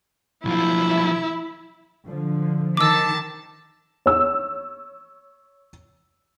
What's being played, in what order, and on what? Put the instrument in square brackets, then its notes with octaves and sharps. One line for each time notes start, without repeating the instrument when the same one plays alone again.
[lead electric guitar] B1 F3 [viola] E4 E5
[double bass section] D3 F3
[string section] D#3 A5 [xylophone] D6 E6
[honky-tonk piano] C#5 E6